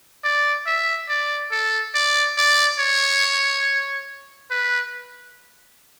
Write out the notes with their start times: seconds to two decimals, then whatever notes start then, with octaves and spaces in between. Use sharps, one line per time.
0.24 D5
0.67 E5
1.09 D5
1.52 A4
1.95 D5
2.37 D5
2.79 C#5
4.51 B4